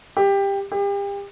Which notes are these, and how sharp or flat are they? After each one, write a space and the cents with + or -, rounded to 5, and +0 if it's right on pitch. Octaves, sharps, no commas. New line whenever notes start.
G4 +15
G4 +35